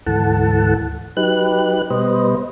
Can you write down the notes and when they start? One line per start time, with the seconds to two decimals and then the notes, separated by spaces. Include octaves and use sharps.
0.06 D2 G#2 E3 A4 F#5 A5
1.17 F#3 D#4 G4 B4 F#6
1.90 B2 G3 B4 C5 D#5